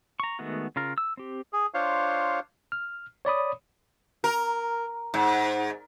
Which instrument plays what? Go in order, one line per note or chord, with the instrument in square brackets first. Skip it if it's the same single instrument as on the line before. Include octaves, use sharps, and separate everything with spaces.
[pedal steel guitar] A#5 C#6
D#3 G#3 A3 B3 F#4
C#3 F4 A#4
E6
C4 G4
[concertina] G#4
D4 F4 C5 C#5 F5
[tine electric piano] F6
C#5 D5 B5 D#6
[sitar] A#4
G#2